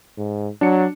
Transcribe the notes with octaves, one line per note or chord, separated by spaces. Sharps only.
G#2
F#3 D4 C#7